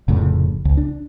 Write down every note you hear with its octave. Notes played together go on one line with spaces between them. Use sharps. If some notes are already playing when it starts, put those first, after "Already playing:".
F1 F2 A2 C#3
C#2
D4